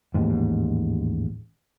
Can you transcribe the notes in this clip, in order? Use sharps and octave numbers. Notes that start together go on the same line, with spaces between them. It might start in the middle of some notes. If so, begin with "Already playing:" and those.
A1 D#2 G#2